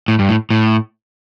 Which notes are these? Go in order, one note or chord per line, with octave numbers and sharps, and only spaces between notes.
A2
G2
A2
A2